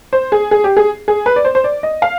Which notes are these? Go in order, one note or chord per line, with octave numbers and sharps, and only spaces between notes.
C5
G#4
G#4
G4
G#4
G#4
B4
D5
C5
C5
D5
D#5
F5